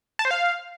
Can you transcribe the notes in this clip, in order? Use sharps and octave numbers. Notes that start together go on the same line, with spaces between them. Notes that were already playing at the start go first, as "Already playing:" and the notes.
A5
C5
F5